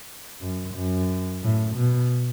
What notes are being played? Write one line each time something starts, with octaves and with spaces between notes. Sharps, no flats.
F#2
F#2
A2
B2